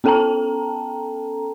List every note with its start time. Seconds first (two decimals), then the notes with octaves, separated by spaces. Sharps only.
0.04 B3 C#4 A4 G5 A5 A#5